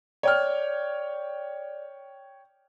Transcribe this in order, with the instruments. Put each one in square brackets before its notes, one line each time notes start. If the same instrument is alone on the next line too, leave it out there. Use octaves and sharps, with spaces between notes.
[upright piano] C#5 G5 F6 [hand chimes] D5